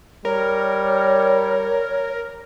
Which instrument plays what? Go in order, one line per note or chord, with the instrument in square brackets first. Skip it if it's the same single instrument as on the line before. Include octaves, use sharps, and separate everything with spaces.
[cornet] G3 [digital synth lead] A#4 [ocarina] C#5